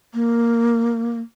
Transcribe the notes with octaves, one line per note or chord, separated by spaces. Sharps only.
A#3